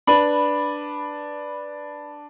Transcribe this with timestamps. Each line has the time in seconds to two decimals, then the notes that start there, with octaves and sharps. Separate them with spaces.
0.07 D4 B4 B5